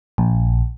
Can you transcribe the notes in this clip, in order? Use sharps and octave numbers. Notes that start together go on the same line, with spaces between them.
A#1